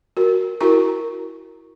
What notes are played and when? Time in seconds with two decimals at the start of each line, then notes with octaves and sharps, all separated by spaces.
0.17 F#4 A#4
0.61 E4 F#4 A#4 A#5 C#6